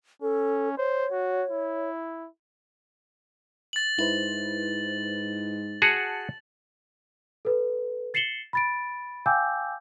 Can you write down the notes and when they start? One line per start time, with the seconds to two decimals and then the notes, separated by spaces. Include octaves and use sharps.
0.22 C#4 A4
0.78 C5 C#5
1.11 F#4
1.50 E4
3.73 A6 F#7
3.99 G#2 E4 B4 C5 F#7
5.82 F#4 G#4 F#5 A5
7.45 A4 B4
8.14 A6 C7 C#7 E7 F#7 G7
8.53 B5 A6 D7
9.26 F5 G5 G#5 D6 E6 G6